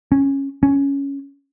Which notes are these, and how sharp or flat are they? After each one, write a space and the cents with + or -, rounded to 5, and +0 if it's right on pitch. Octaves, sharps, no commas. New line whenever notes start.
C#4 -10
C#4 +5